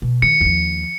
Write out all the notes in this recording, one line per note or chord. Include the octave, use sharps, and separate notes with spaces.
B2
D#3 C#7
D#2 F3